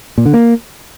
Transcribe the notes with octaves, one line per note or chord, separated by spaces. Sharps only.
A#2
D3
A#3